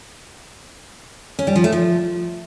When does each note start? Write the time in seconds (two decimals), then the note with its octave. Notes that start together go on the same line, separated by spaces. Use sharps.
1.39 C#4
1.47 G3
1.56 F3
1.64 A3
1.72 F3